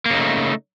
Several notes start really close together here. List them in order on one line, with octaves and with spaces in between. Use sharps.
A#3 C#3 D#4 A3